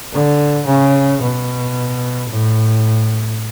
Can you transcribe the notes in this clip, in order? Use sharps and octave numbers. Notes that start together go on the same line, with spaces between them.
D3
C#3
B2
A2